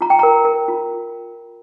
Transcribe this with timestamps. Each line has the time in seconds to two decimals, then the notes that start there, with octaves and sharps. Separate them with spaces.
0.01 F4 A#5
0.10 G5
0.19 A#4 A#5
0.45 A#4
0.68 F4